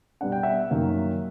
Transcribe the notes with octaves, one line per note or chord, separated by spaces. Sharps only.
B2 G3 B3 D4 F#5
G5
E5 F#5
F#2 D#3 F#3 A#3 C#4